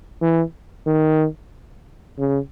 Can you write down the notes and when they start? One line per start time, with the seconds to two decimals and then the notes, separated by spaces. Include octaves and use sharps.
0.22 E3
0.87 D#3
2.19 C#3